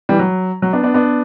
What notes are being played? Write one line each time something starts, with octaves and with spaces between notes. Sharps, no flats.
E3 G3
F#3
F#3
B3 D4
B3 D4
B3 D4